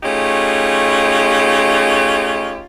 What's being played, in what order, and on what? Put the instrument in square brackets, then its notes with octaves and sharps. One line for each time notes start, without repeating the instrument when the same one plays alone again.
[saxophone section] A3 C#4 D#4 F4 G4 G#4